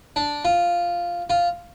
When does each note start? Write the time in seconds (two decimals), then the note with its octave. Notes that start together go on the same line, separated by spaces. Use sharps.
0.16 D4
0.45 F4
1.30 F4